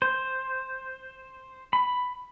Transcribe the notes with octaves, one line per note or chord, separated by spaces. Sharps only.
C5
B5